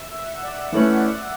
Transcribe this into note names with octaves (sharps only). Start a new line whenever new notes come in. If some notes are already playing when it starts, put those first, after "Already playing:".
Already playing: E5
E5
F#5
E5
D5
E3 A3 C#4 F#5
D5
E5